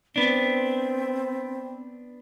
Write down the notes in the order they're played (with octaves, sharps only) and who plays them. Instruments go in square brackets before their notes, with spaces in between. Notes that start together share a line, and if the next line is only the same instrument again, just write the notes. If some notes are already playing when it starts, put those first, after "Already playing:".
[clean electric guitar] B3 D4 [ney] C4